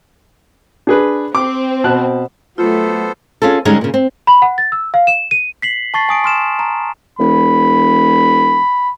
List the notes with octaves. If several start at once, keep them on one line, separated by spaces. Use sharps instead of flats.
D4 G#4 B4
C4 D6
B2 A5 F#6
F#3 A3 B3 F4 A4 C5
C#4 F4 G#4 A4
D3 G3 G#3 C#4 D#4 G#4
A#2 C#3
C4
B5
F#5
A6
E6
F5
E7
D#7
B6 C7 F#7
A5 C#6 A6 C7
G#5 D#6 D7
C6 F6 E7
A#5
E1 B5